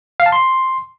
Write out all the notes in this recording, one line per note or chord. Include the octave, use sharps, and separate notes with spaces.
F5
A5
C6